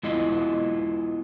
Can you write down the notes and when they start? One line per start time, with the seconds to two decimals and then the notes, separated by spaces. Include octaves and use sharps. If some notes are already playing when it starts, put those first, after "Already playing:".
0.03 G#3 B3 E4 F4 D#5